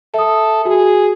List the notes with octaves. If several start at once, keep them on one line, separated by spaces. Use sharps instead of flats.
A4 E5 D#6
F#4 G#4